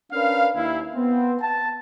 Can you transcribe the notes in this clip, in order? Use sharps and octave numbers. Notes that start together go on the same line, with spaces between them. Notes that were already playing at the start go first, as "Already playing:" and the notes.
C#4 D4 A#4 B4 F5
D#2 E4
B3 C4
A5